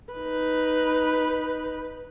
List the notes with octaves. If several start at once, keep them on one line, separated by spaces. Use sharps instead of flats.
D#4 B4